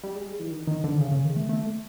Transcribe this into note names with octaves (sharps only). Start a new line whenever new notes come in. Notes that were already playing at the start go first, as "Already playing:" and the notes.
G3
G#3
G3
E3
D#3
D#3
D3
C#3
C#3
D#3
A3
A3